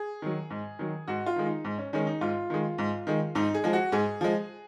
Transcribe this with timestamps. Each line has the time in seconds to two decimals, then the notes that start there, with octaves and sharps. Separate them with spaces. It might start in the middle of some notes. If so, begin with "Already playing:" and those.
Already playing: G#4
0.22 D#3 F#3
0.50 G#2
0.79 D#3 F#3
1.08 G#2 F#4
1.26 F4
1.36 D#3 G#3
1.45 D#4
1.65 G#2
1.78 C#4
1.93 D#3 G#3 C#4
2.07 D#4
2.21 G#2 F4
2.50 D#3 G#3
2.78 G#2
3.07 D#3 G#3
3.35 G#2 D#4
3.54 G#4
3.64 F3 G#3
3.73 F#4
3.92 G#2 G#4
4.21 F3 G#3